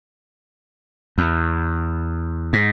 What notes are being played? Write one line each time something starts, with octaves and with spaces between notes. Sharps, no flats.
E2
G#2